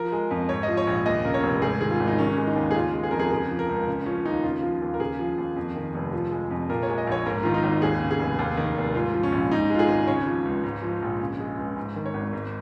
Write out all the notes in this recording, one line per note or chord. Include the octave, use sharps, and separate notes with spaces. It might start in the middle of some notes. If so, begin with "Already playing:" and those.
Already playing: F3 A#4
G#3
F2
G#2 C#5
F3 D#5
C#5
A#1
D#2 D#5
C#3 A#4
C#5
F1
G#2 G#4
D#3 G#4
F4
G#1
D#4
D#3 C#4
G#3
D#4
D#2
G#4
C#3 F4
G#3
G#4
F2 A#4
G#4
C#3 G#4
F3
A#4
C#2
C#3
F3 C#4
D#2 D#4
C#3 F4
F3
D#2
A#4
C#3 G#4
F3
D#2
F2
D#3
F1
F3
G#3
F2
A#2 A#4
C#5
G#3
D#5
A#1 C#5
G#2 A#4
D#3 F4
D#4
G#1
D#2 G#4
C#3
G#4
F1
D#2
D#3
F1
G#2 F4
F3
C#4
A#1
G#2 D#4
G#3 F4
G#4
G#1
C#3 C#5
F3
C#2
G#2
F3
A#1
C#3
G#3
C#2
G#2
D#3
C#5
G#1
G#2